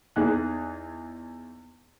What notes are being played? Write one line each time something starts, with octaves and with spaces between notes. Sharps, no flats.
E2 D#4 G#4 F#6